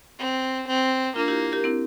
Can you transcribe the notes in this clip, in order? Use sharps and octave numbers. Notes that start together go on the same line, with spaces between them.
C4
C4
A#3 D4 F4
E4 G4
G4 A#4
C4 E4